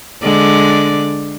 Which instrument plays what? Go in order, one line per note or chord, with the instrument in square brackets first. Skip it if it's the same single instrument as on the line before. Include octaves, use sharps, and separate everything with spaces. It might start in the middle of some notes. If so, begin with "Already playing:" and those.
[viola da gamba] D3 G#3 D5